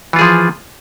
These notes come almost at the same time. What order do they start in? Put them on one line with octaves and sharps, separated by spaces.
E3 F4 G#4 F3